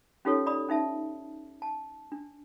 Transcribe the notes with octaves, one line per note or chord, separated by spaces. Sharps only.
C#4 D#4 F4 G4 A4 C#5
D5 B5 D#6
C#4 D#4 E5 A5
A5
D4